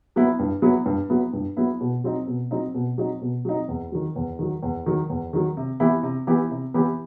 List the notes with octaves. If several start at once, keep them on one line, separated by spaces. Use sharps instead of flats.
F#3 B3 E4
G2
F#3 B3 E4
G2
F#3 B3 E4
G2
F#3 B3 E4
B2
F#3 C4 D#4
B2
F#3 C4 D#4
B2
F#3 C4 D#4
B2
F#3 C4 D#4
E2
D#3 F#3
E2
D#3 F#3
E2
D#3 F#3
E2
D#3 F#3
C3
E3 B3 E4 G4
C3
E3 B3 E4 G4
C3
E3 B3 E4 G4